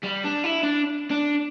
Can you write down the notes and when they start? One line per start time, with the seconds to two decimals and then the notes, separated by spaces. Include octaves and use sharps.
0.03 G3
0.24 D4
0.44 E4
0.63 D4
1.11 D4